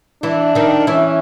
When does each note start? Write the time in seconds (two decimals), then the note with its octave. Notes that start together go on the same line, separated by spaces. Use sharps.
0.23 E3 D4 E4
0.55 D#3 D#4
0.87 E3 C#4 E4